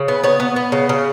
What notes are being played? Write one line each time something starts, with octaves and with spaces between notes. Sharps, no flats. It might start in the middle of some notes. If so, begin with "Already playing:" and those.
Already playing: C#3
B3
B3 C#5
B3
B3
C#3
C#3